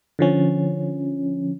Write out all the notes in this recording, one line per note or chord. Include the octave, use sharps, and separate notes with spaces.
D3 F3 C#4